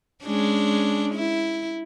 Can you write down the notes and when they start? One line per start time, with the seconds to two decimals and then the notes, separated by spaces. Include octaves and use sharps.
0.24 G#3 C#4 D4
1.15 E4